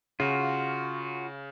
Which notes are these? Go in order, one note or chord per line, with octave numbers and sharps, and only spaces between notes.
C#3 F4 F#4